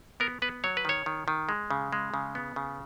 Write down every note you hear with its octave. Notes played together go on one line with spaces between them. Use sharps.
B3 A#4
B3 B4
F#3 C#5
B4
D#3 C#5
D#3
D#3
G#3
C#3
G#3
C#3
B3
C#3